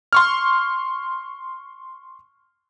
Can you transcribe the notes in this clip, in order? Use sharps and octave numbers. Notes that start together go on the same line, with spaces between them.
C6 C#6 F6